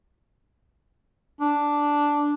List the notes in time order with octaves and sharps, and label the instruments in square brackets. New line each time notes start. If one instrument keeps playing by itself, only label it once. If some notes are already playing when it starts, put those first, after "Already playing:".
[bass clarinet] D4